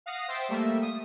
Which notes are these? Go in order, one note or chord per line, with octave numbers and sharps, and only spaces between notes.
F5 F#5 D#6 A#6 C7
C5 E5 G5 A6
G3 A3 A#3 E5
D#6